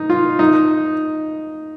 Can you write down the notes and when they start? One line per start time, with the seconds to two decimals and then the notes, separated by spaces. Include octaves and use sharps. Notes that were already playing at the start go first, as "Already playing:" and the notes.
Already playing: D#4
0.10 F4
0.39 D#4